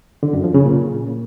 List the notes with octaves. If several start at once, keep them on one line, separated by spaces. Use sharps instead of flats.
D3
F#2
F3
C#3
A#2